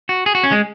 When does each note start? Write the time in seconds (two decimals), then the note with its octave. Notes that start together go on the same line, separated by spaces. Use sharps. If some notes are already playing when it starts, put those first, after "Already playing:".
0.09 F#4
0.26 G#4
0.35 F#4
0.44 C#4
0.52 G#3